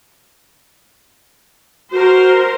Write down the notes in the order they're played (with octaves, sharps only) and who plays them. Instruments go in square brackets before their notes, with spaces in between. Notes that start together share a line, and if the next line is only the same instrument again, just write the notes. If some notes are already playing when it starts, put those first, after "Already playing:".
[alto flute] F#4 [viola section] A#4 C5